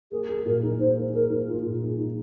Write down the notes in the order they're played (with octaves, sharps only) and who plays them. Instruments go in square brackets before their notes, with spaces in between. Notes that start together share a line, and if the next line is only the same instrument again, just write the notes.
[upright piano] A#3 [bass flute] G#4
[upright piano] G#4
[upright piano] A#2 [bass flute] A#4
[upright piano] D#4
[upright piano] D#4 [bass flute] C5
[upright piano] A#3
[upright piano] G#4 [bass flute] A#4
[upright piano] D#4
[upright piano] A#3 [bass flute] F4
[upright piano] A#2
[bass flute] D#4 [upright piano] G#4
[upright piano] D#4